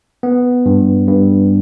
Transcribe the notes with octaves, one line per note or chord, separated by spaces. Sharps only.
B3
G2
G2